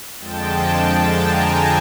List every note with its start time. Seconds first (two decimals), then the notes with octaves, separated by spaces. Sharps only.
0.19 F2 D3 F3 G#3 G5 A5
1.21 G#5 A#5